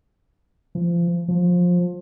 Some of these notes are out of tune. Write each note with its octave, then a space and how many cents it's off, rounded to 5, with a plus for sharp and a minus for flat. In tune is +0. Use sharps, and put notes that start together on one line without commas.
F3 -30
F3 +20